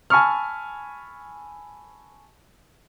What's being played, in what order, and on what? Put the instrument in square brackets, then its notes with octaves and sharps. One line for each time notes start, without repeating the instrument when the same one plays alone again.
[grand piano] G#5 A5 B5 C#6 E6 F6